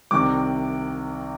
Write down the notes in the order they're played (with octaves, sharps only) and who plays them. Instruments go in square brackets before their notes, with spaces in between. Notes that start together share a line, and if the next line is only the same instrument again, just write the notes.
[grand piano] C2 C3 D#3 D6